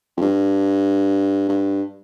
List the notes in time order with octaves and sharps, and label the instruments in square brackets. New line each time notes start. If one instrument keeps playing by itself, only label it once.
[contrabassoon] F2
G2
G2